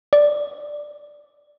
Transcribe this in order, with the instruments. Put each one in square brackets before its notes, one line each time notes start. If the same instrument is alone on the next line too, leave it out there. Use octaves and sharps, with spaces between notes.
[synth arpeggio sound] D5